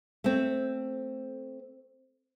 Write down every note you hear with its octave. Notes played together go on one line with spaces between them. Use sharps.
A3 C4